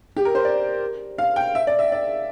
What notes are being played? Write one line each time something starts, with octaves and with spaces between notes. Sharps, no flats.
G4
A#4
C5
D5
F5
G5
E5
D5
E5
D5